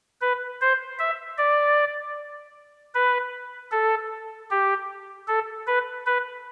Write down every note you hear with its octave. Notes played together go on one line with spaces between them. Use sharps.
B4
C5
E5
D5
B4
A4
G4
A4
B4
B4